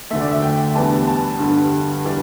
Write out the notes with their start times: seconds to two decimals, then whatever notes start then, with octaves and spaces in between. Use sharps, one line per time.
0.10 D2 D3 A3 E5
0.21 D5
0.31 E5
0.42 G5
0.75 E2 E3 G3 B3 D4 A5
1.08 A5
1.39 G2 D3 G3
2.04 E3 G3 D4